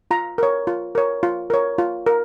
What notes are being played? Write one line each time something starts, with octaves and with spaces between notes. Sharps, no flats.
F4 A#5
A#4 C#5
F4
A#4 C#5
F4
A#4 C#5
F4
A#4